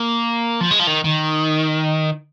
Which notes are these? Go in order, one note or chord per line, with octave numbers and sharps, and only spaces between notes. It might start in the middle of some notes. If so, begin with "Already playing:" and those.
Already playing: A#3
F3
G#3
F3
D#3
D#3